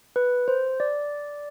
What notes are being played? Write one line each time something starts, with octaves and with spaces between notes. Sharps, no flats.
B4
C5
D5